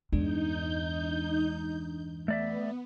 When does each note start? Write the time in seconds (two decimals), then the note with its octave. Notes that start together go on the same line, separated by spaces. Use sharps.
0.12 E2 G2 G#3 D4 D#4 G6
2.28 A3 B3 D5 E5